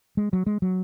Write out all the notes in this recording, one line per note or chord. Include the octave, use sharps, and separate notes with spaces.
G#3
F#3
G#3
F#3